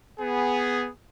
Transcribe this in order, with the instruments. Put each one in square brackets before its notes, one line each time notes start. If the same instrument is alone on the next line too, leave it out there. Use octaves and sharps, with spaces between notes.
[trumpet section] B3 G#4